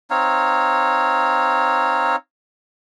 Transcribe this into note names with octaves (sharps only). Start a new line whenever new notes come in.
C4 D#4 C#5 F5